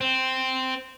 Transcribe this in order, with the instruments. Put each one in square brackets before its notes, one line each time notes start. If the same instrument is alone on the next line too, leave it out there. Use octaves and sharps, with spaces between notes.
[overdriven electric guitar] C4